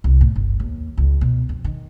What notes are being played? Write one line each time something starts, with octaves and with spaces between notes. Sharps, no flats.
C2
A2
G1
D#2
C#2
B2
F2
D#3